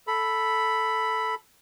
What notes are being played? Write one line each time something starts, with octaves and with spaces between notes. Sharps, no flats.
A4 B5